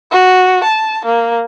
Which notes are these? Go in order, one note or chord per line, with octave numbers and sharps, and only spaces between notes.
F#4
A5
A#3